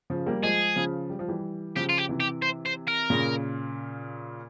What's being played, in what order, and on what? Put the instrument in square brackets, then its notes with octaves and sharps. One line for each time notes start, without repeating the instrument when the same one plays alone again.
[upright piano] C#3 F3
G3 A#3
[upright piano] F3 G#3 [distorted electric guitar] G#4
[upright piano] C#3 F3
G3
F3
E3 G3
[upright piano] C#3 F3 [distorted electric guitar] G4
[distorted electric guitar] F4
G4
[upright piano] C3 E3
[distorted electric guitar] G4
C5
C5
A#4
[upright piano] A#2 C#3